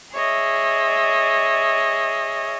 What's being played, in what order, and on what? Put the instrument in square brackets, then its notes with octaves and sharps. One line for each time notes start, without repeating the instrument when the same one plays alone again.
[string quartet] G#4 C#5 D#5 E5